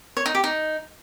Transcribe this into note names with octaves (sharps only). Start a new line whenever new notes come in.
C#5
D#4
G4
D#4